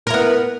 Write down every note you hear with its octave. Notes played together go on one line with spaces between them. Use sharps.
B3 E4 A#4